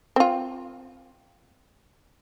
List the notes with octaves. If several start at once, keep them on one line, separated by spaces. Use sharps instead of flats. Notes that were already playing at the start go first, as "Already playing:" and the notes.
C4 F4